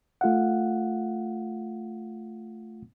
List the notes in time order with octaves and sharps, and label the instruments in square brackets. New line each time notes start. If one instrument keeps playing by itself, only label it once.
[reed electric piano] A3 F4 F5 F#5